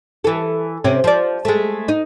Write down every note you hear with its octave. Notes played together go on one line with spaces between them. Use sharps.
E3 A4
C3 C4 C#4
F3 D5
G#3 A3
D#4